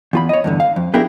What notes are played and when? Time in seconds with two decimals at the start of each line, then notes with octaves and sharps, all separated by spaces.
0.13 E2 F4 B5
0.29 C#5 D#5
0.44 E2 G2 D3
0.60 F5
0.76 F2
0.94 B3 D4 E4 G4 G#4 A#4